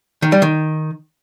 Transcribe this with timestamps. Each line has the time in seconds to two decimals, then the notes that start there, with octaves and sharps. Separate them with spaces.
0.22 D#3
0.32 G3
0.42 D#3